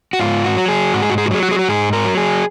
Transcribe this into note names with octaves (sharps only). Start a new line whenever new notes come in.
F#4
G#2 F4
F#4
F#3
G#4
G#2 F#4
G#4
F#4
G#4
F#4
F#3 G#4
F#4
G#4
F#4
G#2 G#4
A#4
F#3
G#4